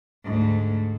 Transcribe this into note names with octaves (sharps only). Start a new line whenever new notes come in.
D2 G#2